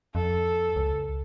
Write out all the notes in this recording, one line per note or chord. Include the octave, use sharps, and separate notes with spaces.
F2 A4
C#2